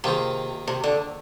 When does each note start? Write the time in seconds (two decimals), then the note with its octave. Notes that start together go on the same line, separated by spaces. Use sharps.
0.04 C3 D#3 A#3 F4 G#4 C5
0.68 C3
0.84 D3